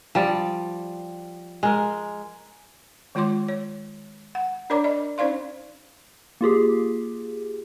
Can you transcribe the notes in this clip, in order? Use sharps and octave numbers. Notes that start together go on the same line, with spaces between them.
F3 G3 D5
G#3 A#4
D#3 G#3 F4 C#5 C6 D6
C#5
F#5
D4 A#4 C#5 D5 A#5 D6
D5 D#5 B5
C#4 D#4 C5 D5 F5 C6
A#3 F4 G4 G#4